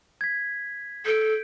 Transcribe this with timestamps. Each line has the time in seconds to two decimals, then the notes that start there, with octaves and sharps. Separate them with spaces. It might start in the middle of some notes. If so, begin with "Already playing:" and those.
0.21 G#6 B6
1.06 A4 G6 D7